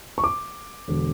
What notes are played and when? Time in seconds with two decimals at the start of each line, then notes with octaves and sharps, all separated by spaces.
0.18 C#6
0.24 D6
0.88 E1 D3